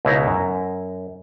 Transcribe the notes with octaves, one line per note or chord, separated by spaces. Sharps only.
C#2 B2 D#4 E4 C5 A#5
F#2